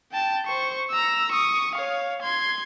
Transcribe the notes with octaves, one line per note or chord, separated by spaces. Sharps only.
G5 A5
C5 C#6
A#5 E6
C#6 D#6
C#5 F5
C6 G#6